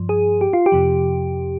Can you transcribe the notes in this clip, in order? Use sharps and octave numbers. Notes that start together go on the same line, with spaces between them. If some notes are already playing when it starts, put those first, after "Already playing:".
Already playing: G2 F3
G#4
G4
F4
G4
F2 C3 F3